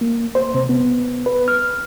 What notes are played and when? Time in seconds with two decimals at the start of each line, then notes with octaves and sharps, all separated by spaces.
0.01 A#3
0.35 C5
0.54 C3
0.69 B3
1.26 B4
1.48 F6